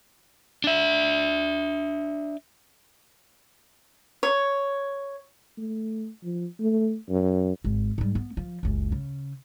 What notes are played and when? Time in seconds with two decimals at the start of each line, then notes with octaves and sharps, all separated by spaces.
0.64 D4 E5
4.23 C#5
5.58 A3
6.23 F3
6.60 A3
7.09 F#2
7.64 G#1
7.98 G#2 G3
8.15 B3
8.37 F3
8.63 F#1 C#2
8.92 C#3